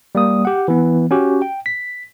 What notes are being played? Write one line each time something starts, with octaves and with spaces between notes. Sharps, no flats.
G3 A#3 D#6
G4 F#5
E3 B3
C#4 F#4 G4
G5
B6